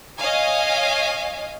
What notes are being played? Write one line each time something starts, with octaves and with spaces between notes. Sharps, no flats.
C#5 D#5 F5 G#5